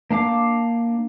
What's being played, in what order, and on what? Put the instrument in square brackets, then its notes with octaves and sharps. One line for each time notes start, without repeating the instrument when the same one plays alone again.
[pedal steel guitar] A#3 D4 F5 D6